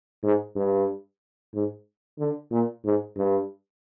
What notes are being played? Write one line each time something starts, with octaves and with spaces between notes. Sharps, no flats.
G#2
G2
G#2
D3
A#2
G#2
G2